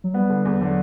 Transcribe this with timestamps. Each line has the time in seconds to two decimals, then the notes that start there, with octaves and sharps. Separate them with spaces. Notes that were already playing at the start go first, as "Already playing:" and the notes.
0.04 F#3
0.14 G3 B3
0.30 D3
0.45 E2
0.60 D3 F#3